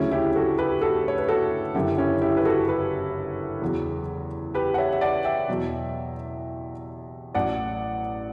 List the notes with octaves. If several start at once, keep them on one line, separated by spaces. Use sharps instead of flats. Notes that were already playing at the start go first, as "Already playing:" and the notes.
Already playing: D2 C#3 F#3 C#4 E4
E4 G4
F#4 A4
G4 B4
F#4 A4
C#5
B4
F#4 A4
F#1 F#2 D3 F#3 E4 G4
C#4 E4
E4 G4
B4
F#4 A4
G4 B4
E2 C#3 F#3
G4 B4
F#5
C#5 E5
E5
D5 F#5
E5 G5
E2 B2 F#3
A1 A2 F#3 D5 F#5